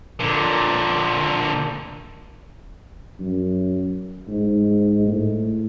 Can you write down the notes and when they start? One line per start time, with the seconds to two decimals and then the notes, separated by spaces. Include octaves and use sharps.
0.20 A#2 D3
3.19 F#2
4.28 G#2
5.07 A2